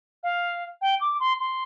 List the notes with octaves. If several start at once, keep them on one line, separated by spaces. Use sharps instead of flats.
F5
G5
D6
C6
C6